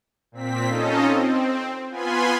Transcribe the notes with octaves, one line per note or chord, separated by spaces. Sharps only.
A#2 C4 B6
C#4 D#4 F4 A4 D#5
C4
B3 F4 G#5 B5 C6